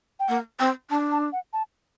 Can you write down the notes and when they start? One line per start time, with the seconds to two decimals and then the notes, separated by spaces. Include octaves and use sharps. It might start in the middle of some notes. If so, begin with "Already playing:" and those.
0.20 G5
0.28 A#3 F#5
0.60 C4 G5
0.90 D4 A5
1.12 A5
1.33 F#5
1.53 A5